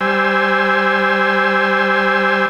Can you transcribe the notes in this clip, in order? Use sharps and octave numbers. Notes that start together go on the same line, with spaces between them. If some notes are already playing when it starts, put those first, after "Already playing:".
G3 C5 G#5 E6